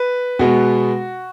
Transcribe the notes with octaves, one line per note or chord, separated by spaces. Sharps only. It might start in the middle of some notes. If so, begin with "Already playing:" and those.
Already playing: B4
B2 G#3 B3 F#4